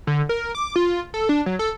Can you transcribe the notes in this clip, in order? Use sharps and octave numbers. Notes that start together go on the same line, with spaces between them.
D3
A#4
D6
F4
A4
D4
F#3
A4